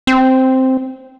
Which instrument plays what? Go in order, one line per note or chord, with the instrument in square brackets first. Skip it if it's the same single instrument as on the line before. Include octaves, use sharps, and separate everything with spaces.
[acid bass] C4